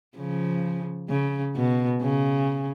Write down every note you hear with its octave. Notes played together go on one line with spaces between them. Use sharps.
C#3 F3
C#3
B2
C#3